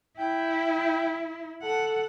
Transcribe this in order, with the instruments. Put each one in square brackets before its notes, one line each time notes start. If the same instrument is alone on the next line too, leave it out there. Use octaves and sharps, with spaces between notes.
[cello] E4 [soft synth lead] G5
[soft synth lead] A4 [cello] F#5